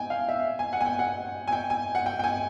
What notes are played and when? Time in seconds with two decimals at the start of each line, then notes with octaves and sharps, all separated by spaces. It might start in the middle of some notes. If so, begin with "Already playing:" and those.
Already playing: G5 G#5
0.10 F5
0.29 E5
0.59 G#5
0.73 F#5
0.81 G#5
0.86 G5
0.99 F#5
1.48 G#5
1.53 G5
1.70 G#5
1.95 F#5
2.06 G5
2.19 G5
2.24 G#5